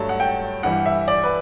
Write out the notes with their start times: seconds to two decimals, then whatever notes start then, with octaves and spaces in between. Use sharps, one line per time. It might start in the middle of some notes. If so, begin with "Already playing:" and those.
Already playing: G2 F#3 A3 A5
0.09 F#5
0.20 G5
0.63 G2 E3 G3 F#5
0.86 E5
1.08 D5
1.24 B4